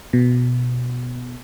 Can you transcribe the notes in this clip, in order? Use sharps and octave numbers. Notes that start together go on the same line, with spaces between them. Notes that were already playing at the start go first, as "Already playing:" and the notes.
B2